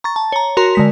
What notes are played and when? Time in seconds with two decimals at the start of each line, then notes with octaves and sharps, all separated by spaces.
0.04 A#5 C#6 A6
0.16 A5
0.32 C#5 A#5
0.57 F#4 A#4 A#5 C6
0.75 D3 G#3 B6